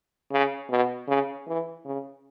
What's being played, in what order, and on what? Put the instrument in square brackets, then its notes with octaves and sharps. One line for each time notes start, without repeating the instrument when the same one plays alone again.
[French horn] C#3
B2
C#3
E3
C#3